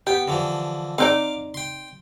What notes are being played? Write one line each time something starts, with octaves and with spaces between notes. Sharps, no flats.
B3 G4 G5
D3 E3 F3
C4 D#4 D5 F5 D6
G5 C6